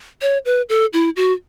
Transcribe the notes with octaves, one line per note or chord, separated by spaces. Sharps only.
C#5
B4
A4
E4
F#4